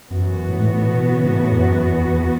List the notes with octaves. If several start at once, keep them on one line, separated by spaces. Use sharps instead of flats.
F#2 E3 B3 F#4
A2
G#2
A2
A2
B2
C#3
G#2
A2
E2
F#2
E2
E2